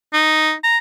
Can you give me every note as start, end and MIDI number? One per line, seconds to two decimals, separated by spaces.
0.13 0.53 63
0.63 0.78 82